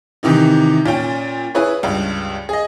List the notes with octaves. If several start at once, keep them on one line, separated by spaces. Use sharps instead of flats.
C3 D#3 E3 D#4
A#2 C#4 G5
E4 G#4 B4 C#5
C#2 G2
G#4 D#5